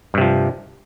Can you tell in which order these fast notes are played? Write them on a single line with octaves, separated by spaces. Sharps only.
G2 C3 F3